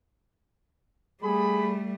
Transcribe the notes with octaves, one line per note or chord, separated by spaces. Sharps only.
G3 A3 G#4 B5